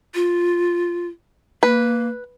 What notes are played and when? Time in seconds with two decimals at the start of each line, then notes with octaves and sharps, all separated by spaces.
0.15 F4
1.63 A#3 B4